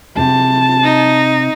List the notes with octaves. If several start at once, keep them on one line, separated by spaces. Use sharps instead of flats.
C3 G#4 A5
D#4